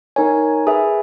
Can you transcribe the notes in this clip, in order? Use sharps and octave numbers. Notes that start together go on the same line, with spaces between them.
D#4 A#4 C#5 G#5
G#4 B4 E5 G#5